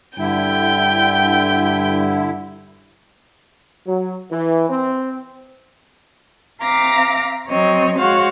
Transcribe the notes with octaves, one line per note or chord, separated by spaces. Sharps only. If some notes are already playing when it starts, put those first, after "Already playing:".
G2 D3 E4 G5
F#3
E3
C4
C4 E5 F5 A#5 D6 A#6
F#3 C4 C#5 D#5
G#3 F#4 C5 C#5 F5 F#5